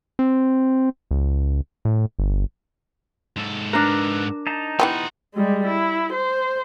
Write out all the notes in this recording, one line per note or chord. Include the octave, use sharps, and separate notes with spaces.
C4
C#2
A2
G1
G#2 A4
D4 A#4 B4
D#4 A5 A#5
E3 B3 F4 G4 F#5
G3 G#3
E4
C5